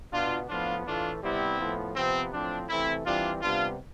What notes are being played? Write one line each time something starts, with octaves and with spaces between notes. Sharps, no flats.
B2 B3 D4 F4
A2 F3 B3 D4 F4
A2 E3 A3 D4 F4
C3 G3 B3 C4 E4
A2 F3 B3
C3 F3 B3 C4
A2 F3 C4 D4
C3 E3 A3 C4 E4
E3 G3 C4 D4 F4
C3 G3 B3 D4 F4